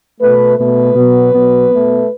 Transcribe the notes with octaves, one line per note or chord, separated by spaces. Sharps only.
B2 A3 B4
B2 A3 B4
B2 F#3 B3
B2 F#3 B3
B2 A3